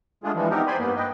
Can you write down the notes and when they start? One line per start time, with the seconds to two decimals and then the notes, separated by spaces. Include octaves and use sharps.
0.24 D3 G#3 A3 D4 F4 G#4
0.35 E3 F3 G3 G#3
0.50 B3 C4 D#4 G4 A#4
0.67 C5 D5 G#5 B5 C6
0.79 G2 A#3 B3
0.96 B4 D#5 G5